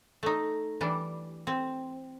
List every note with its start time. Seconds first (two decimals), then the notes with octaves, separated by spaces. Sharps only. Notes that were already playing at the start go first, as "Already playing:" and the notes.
0.23 A3 D#4
0.81 E3 G3 D4
1.47 C4